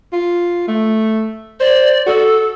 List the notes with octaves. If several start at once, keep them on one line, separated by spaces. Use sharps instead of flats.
F4
A3
C5 D5
F#4 A4